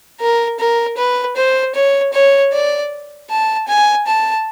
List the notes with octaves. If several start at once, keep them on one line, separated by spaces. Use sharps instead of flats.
A#4
A#4
B4
C5
C#5
C#5
D5
A5
G#5
A5